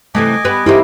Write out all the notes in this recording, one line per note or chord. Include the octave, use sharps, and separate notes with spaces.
C3 E3 A3 D#5 G#5 D6
G3 B3 B4
A#3 C4 D#4 E4 G4